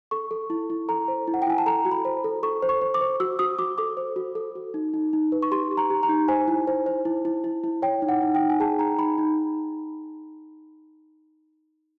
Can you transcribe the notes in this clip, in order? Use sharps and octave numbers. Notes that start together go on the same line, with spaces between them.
A4 C#6
A4
E4
E4
A4 A#5
C5
E4
F#5
G5
E4 G#5
A5
A4 A#5
F#4
B5
C5
A4
A4 C#6
C5
C#6
C5
D6
C5
F#4 E6
F#4 D#6
F#4 D6
A4 D6
C5
F#4
A4
F#4
D#4
D#4
D#4
B4
C#6
G4 C6
G4
A#5
G4
A#5
D#4
C5 G#5
E4
C5
C5
E4
E4
E4
E4
C#5 G5
D#4
F#5
D#4
G5
D#4
G#5
G#4 A5
D#4 A#5
D#4 B5
D#4